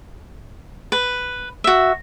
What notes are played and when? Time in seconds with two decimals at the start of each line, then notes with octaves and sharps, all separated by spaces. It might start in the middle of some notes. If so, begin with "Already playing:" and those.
0.92 B4
1.64 F#4 E5